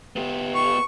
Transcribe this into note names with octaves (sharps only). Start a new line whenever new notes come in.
B3 G4
C#6